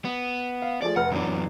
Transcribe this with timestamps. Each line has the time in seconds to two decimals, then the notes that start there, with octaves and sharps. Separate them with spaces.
0.05 B3
0.62 F5
0.82 F3 A3 G#4 D5
0.96 F1 B4 F#5 F6
1.12 F#2 E3 F#3 B3 D4